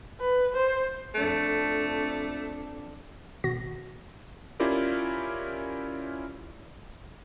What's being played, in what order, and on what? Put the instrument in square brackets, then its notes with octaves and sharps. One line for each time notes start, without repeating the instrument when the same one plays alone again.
[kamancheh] B4
C5
[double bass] F2 D4 [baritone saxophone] A3
[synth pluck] G#1 B2 F#4 A#6
[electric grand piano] C#4 E4 F4 G4 A#4 D5